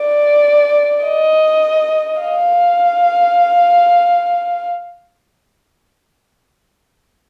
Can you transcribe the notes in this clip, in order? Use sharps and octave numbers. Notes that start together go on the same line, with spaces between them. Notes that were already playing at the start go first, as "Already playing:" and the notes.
Already playing: D5
D#5
F5